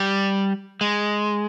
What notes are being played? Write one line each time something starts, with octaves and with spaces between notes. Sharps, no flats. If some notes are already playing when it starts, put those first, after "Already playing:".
Already playing: G3
G#3